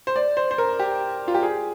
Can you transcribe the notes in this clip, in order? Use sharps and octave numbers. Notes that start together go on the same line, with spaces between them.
C5
D5
C5
C5
A#4
G4
F4
G4
G#4